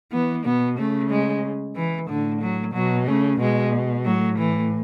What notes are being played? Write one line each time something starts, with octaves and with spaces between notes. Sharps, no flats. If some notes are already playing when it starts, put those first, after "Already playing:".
E3 B3
B2 B3
C#3 A3
G#3
E3
A2 D3
F#3
B2 F#3
C#3 A3
B2 G#3
A2 F#3
E3